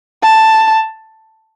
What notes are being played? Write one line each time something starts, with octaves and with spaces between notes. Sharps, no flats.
A5